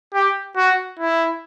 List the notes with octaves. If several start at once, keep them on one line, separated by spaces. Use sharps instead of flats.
G4
F#4
E4